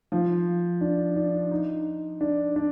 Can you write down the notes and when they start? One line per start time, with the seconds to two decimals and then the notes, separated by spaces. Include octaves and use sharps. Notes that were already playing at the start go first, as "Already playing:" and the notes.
0.12 F3
0.81 D4
1.16 D4
1.51 D#4
2.21 D4
2.56 D4